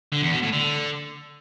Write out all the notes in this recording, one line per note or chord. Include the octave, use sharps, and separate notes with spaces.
D3
E2
B2
A2
D3